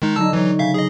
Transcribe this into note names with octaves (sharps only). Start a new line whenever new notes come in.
D#3 G#3 D#4
D3 F#3 D#4 A5 E6
E3 F#3 D#4 C#5
C#3 E5 F5 G6
G#4 D#5